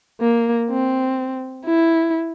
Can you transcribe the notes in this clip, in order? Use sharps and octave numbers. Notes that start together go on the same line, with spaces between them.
A#3
C4
E4